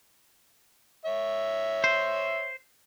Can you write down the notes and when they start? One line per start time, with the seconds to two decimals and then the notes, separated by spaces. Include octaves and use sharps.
1.05 C#5 E5
1.84 C5